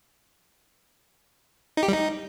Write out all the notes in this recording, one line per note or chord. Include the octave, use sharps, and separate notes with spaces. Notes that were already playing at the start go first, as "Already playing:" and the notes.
D#4
G4
G3
D#4